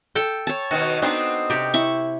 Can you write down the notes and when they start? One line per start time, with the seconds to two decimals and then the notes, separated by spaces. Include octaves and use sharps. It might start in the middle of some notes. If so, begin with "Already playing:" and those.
0.15 A4 G5
0.47 C#5 A5
0.71 B2 D#3 F#4
1.02 B3 C4 D4 D#4
1.50 C3 G4
1.74 E4 C#6